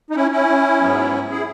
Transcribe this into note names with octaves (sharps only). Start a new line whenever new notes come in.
D#4
C#4 E4
C#4 E4
G#2 F#3 B3
E4 G#4